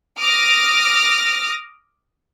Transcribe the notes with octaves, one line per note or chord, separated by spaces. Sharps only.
D6 D#6 F6 A#6